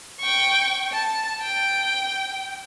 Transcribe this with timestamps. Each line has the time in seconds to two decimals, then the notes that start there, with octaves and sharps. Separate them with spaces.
0.20 G5 C#6
0.92 A5
1.42 G5